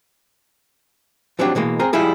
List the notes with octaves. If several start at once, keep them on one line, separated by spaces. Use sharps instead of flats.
F3 F#3 C4 D4 G4
B2 E3 G#3 A#3
C4 G#4 A#4
F3 G3 G#3 E4 G#4